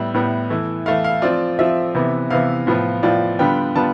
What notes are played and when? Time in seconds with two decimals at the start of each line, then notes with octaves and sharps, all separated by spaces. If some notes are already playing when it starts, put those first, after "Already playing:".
Already playing: A2 G3 B3 E5
0.14 A2 G3 B3
0.50 E3 A3 E4
0.86 E3 A3 E4 F5
1.04 F5
1.22 F3 C4 F4 D5
1.59 F3 C4 F4 E5
1.95 C3 E3 B3
2.30 C3 E3 B3 F5
2.67 A2 F3 B3 F4
3.03 A2 F3 B3 F4 D5
3.39 D3 G3 B3 F4 G5
3.75 D3 G3 B3 F4 A5